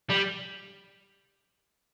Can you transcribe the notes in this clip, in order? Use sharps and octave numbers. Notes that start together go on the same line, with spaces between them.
G3